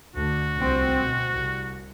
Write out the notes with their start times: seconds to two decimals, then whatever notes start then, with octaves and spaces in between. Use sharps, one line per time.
0.16 D2 D3 F#4
0.55 C2 C4
1.04 B2
1.33 C2